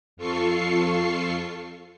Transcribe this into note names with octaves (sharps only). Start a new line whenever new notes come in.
F2 F4 A4 C#6 C7